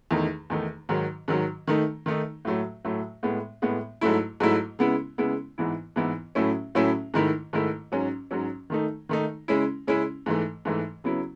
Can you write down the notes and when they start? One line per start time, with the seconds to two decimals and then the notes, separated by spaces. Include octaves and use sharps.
0.11 E2 D#3 A3 D#4
0.50 E2 D#3 A3 D#4
0.89 G#2 D#3 F#3
1.28 G#2 D#3 F#3
1.67 D#3 A3 D#4
2.06 D#3 A3 D#4
2.45 A2 F#3 A3
2.85 A2 F#3 A3
3.23 A2 G#3 B3
3.62 A2 G#3 B3
4.01 G#2 F#3 A3 E4
4.40 G#2 F#3 A3 E4
4.79 C#3 G#3 B3 E4
5.18 C#3 G#3 B3 E4
5.58 G#2 E3 B3 E4
5.96 G#2 E3 B3 E4
6.35 A2 F#3 A3 C#4 E4
6.75 A2 F#3 A3 C#4 E4
7.14 G#2 D#3 A3 E4
7.53 G#2 D#3 A3 E4
7.92 G#2 F#3 C#4
8.31 G#2 F#3 C#4
8.70 D#3 A3 D#4
9.09 D#3 A3 D#4
9.48 C#3 G#3 C#4 E4
9.87 C#3 G#3 C#4 E4
10.26 G#2 E3 A3
10.65 G#2 E3 A3
11.04 C#3 F#3 B3 E4